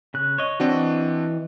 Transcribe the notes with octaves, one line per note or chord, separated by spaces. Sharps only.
C#3 F#6
C#5 D#5
E3 C4 D4 F#4 D#5